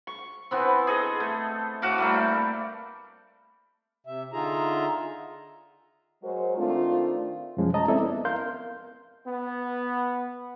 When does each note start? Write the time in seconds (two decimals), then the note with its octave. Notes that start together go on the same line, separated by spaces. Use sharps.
0.07 C#6
0.51 E3 B3 C4
0.87 G#4 A4 D#5
1.20 A3
1.82 A2 F#4 F5 D6
1.98 G3 A3 A#3
4.07 C3 E5
4.33 D3 D#4 F4 G#4 E5 A#5
6.24 F#3 G#3 F#4 A#4 C5
6.57 D#3 A3 C4 D4 F4
7.57 F#2 C3 F3 G#3 C#4
7.74 D#5 A5 A#5
7.88 C4 C#4 E4 A4 D5 E5
8.02 B3
8.25 A#4 F5 C6 G6
9.27 B3